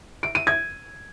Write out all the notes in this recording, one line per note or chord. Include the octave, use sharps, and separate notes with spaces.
D7
D#7
G#6